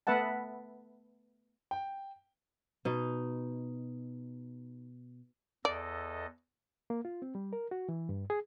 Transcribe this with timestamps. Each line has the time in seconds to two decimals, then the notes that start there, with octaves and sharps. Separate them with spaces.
0.07 A3 B3 B4 E5 F#5 A5
1.71 G5
2.85 B2 D#4
5.65 E2 A4 D5 D#5
6.90 A#3
7.05 F4
7.22 C4
7.35 G3
7.53 A#4
7.71 F#4
7.89 E3
8.09 G2
8.30 G#4